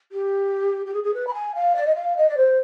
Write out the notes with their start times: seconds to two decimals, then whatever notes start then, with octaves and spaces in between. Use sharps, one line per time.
0.12 G4
0.86 G4
0.94 G#4
1.04 G#4
1.14 B4
1.27 B5
1.34 G#5
1.55 F5
1.76 D5
1.86 D#5
1.95 F5
2.17 D#5
2.29 D5
2.37 C5